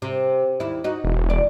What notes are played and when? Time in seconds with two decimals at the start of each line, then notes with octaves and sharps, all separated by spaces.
0.02 C3
0.60 D#2 E4
0.84 D#4 F#4
1.04 E1
1.30 D5